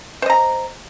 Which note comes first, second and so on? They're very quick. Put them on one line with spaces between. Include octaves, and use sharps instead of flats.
C5 D#5 A#5